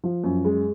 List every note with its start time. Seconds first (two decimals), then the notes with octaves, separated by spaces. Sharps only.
0.04 F3
0.24 F#2
0.45 G#3